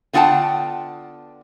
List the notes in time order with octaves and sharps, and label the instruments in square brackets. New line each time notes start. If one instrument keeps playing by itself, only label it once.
[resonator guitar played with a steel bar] D3 B3 F4 F#5 G5 A5